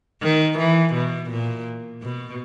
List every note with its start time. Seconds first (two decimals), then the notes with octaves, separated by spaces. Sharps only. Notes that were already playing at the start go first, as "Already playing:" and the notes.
0.23 D#3
0.59 E3
0.94 B2
1.30 A#2
2.02 B2